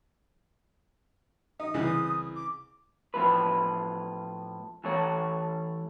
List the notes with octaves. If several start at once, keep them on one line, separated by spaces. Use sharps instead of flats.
D#4 D#6
C2 C#3 E3
D6
A2 F3 B4
E3 A3 C#5